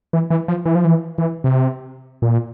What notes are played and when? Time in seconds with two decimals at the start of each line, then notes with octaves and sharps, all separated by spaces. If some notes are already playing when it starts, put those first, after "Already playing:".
0.13 E3
0.30 E3
0.48 F3
0.66 E3
0.75 F3
0.85 E3
1.18 E3
1.44 C3
2.22 A#2